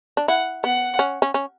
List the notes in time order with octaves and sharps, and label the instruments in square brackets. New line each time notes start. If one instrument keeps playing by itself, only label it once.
[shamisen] D4
[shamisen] E4 [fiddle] F#5
[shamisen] B3 [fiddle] F#5
[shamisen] C#4
C#4
C#4